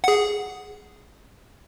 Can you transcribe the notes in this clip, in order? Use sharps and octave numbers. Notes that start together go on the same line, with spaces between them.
G#4 F#5